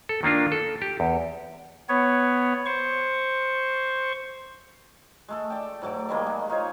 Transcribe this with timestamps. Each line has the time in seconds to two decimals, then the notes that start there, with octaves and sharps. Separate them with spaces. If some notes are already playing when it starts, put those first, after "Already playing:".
0.09 A4
0.23 D#3 A#3 D4 F4
0.52 A4
0.82 G4
1.00 E2
1.89 B3 C#5
2.66 C5 C#6
5.29 G#3 A3 A4
5.50 D5 G5
5.82 G#2 F#3 A3 D6
6.09 D#3 G3 G#3 A#3
6.26 G#3
6.50 D#4 F4 C5 C#5